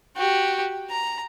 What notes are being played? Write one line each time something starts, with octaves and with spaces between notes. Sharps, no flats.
F#4 G4
A#5